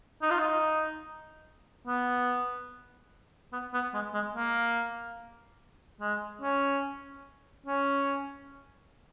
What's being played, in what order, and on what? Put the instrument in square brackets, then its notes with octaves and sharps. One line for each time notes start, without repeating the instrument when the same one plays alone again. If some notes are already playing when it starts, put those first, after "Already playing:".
[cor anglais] D#4
F4
D#4
B3
B3
B3
G#3
G#3
A#3
G#3
C#4
C#4